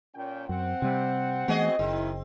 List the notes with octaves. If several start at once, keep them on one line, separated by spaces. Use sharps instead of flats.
A#2 C#4 G5
F#2 C4 F#5
C3 G3
E3 A3 B3 F#4 G#4 D#5
F#1 D#3 C4 E4